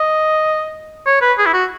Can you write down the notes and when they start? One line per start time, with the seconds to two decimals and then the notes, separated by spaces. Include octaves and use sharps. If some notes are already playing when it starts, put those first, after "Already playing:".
Already playing: D#5
1.06 C#5
1.21 B4
1.38 G#4
1.46 E4
1.54 F#4